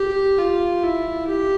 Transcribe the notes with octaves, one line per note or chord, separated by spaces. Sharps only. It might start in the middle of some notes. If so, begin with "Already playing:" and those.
Already playing: G4
F4
E4
G4